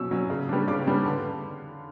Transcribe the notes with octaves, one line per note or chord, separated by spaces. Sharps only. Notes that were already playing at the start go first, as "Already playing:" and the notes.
Already playing: B2 F#3 C#4 E6
F#3 C#4
C#3
G3 B3 D4
C#3 D6
G3 B3 D4
D3